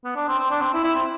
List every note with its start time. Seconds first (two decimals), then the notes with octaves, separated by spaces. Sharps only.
0.04 B3
0.16 D4
0.28 C4
0.39 C4
0.51 D4
0.61 C4
0.74 E4
0.84 E4
0.95 C4